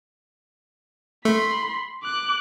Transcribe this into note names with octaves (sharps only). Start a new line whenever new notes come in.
A3 B5 C6
D6 F#6